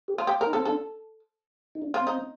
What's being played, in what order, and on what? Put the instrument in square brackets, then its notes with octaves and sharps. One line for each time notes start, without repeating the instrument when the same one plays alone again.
[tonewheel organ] G4
[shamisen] F4
G4
A#4
[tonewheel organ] D#4
[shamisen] A4
[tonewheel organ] C4
[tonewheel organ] D4 [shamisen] A4
[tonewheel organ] D#4
D4
[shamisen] F4
[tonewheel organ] C4
[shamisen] D#4